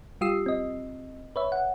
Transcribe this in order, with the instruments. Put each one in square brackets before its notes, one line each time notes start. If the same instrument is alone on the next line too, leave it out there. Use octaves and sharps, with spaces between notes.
[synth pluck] G3 F4 G4 D#6 E6 C7
C4 D#5
B4 C#5 E5
F#5